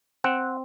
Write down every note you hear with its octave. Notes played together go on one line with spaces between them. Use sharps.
C4 F#5